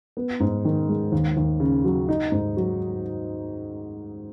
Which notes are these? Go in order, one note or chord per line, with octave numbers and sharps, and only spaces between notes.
B3
G#2
D#3
G#3
D#2
D#2
C#3
F#3
D#4
G#2
F#3